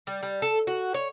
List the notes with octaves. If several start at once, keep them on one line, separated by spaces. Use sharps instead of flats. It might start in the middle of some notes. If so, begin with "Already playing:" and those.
G3
G3
A4
F#4
C#5